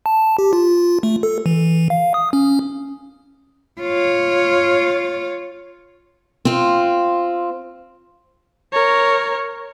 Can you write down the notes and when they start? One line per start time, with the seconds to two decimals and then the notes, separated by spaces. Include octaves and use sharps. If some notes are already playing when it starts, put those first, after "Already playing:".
0.06 A5
0.38 G4
0.53 F4
1.03 A3
1.23 A4
1.46 E3
1.90 F5
2.14 D#6
2.33 C#4
3.81 F4 C#5
6.45 C4 F4
8.73 A#4 C#5